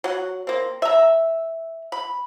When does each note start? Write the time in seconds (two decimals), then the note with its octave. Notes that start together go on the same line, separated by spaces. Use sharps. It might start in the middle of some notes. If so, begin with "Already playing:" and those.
0.04 F#3 F#5
0.47 A#3 C4
0.82 E5 A#5
1.92 B5